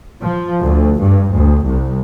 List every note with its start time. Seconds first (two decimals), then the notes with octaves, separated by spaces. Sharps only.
0.22 F3
0.64 D2
1.00 G2
1.34 D2
1.66 C2